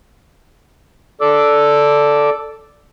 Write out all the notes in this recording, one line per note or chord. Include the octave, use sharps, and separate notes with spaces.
A4 D5 D6 E6